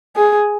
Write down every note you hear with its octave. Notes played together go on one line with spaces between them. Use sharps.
G#4